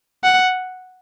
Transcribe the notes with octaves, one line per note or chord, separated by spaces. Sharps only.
F#5